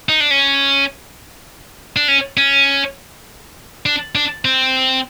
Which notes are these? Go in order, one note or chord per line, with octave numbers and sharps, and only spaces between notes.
D#4
D4
C#4
D4
C#4
C#4
D4
D4
C4